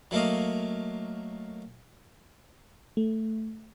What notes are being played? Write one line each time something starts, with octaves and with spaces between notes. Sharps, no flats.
F#3 A3 A#3 D#5 F5
A3